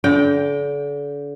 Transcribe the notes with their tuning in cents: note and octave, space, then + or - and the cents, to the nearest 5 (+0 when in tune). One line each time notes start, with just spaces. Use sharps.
D3 -40 G5 +0